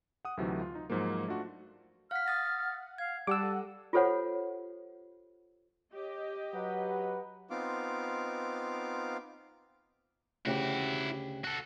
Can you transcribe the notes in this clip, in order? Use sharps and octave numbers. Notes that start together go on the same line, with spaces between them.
F#5 D#6
D2 C3 E3 F#3 A3 D#4
F4
D#4
G#2 F3 F#3 A#3
A3 D4 F4 F#4
F5 F#5 F6 B6
D#6 A6 A#6
F5 G#6
G3 G4 F#5 A5 D6 E6
A4
F4 G4 A4 C5 C#5 F#5
G4 C#5 D#5
F#3 B4 F#5
B3 C4 D#4 F4 F5 D6
D2 C#3 E4 F#4 G4
F#4 A4